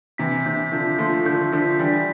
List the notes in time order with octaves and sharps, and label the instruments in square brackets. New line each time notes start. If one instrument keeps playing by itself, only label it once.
[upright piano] C3 E3 [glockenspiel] B6
[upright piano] C3 E3 [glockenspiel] G6
[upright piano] D3 F3 [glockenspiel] B6
[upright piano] F3 A3 [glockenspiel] C6
[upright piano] D3 F3 [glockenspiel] G6
[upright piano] D3 F3 [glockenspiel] B6
[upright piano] E3 G3 [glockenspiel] B6